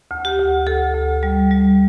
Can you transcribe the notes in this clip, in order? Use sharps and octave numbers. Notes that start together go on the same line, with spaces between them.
D2
G4
D2
D2 A4
D2
G3
G3